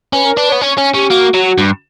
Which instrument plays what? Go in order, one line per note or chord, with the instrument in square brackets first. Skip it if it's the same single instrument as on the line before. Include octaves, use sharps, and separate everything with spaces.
[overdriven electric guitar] C#4 [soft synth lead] B4
[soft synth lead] A#4
[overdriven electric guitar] D4 [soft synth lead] B4
[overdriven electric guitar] B3 [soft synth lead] C#5
[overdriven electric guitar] C#4 [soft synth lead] C#5
[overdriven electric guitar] C#4
[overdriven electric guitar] C#4 [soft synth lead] G4
[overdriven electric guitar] A#3 [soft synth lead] F#4
[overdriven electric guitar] F#3 [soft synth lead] F#4
[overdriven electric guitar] G2